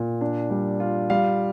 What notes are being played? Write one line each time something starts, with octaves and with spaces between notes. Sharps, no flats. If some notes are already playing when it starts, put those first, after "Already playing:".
Already playing: A#2
D4
G3
F4
G3 F5